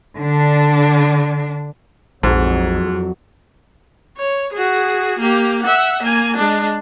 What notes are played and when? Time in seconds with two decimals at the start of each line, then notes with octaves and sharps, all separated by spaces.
0.18 D3 D4
2.23 A#1 F2 G#2 F#3 E4 F#4 A4
4.18 C#5
4.53 F#4 G#4
5.19 A#3 G4
5.63 E5 F#5
6.03 A#3 G#5
6.36 G#3 D4